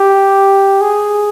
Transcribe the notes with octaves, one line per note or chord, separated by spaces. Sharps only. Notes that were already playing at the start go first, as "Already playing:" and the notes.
Already playing: G4
G#4